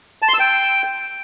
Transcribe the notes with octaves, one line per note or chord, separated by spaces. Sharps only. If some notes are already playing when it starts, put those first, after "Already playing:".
A5
C6
E6
G5